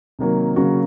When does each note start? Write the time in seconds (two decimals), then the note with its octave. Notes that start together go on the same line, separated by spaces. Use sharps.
0.19 C3 D#3 F#3 A#3
0.56 C#3 F#3 A#3 F#4